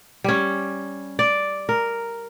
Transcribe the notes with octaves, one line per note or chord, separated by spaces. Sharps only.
G3 C#4
D5
A#4